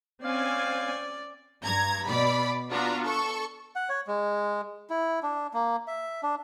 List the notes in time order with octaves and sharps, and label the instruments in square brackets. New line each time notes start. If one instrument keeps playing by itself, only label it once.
[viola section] C4 C#4 G#5 [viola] D5 [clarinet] F5
[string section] G2 A#5 G#6
B2 D5 B5
B3 D4 F4 F#4 A#5
A4 C#6
[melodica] F#5
C#5
G#3
E4
D4
A#3
E5
D4